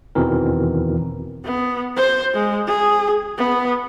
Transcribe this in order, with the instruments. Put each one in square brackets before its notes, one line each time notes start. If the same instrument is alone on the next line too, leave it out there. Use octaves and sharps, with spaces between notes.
[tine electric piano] E2 B2 D#3 E3 C4 A#4
[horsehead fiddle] B3
C5
G#3
G#4
B3